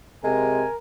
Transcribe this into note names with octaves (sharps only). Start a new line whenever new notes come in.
C3 G#3 A#4 G#5